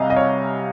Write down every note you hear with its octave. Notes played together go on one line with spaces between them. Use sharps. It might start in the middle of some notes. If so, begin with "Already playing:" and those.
Already playing: C2 C3 G3 D#5 F5 G#5 A#5
D#5
C#5